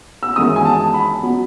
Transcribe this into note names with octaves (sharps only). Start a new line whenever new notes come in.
E6
G#1 F#2 E3 G#3 B3 D#6
G#5
A5
B5
B2 F#3